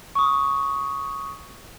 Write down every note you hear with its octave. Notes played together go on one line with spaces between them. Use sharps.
C#6 D#6